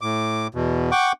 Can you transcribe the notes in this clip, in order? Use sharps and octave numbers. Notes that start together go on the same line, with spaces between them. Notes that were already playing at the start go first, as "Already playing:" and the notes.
A2 D6
E2 B2
F#5 G5 C#6 D6